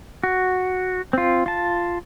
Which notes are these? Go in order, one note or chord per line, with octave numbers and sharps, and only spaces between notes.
F#4
C4 F4
F4 A5